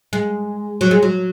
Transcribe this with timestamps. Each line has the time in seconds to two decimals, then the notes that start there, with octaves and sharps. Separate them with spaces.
0.13 G#3
0.81 F#3
0.91 G#3
1.03 F#3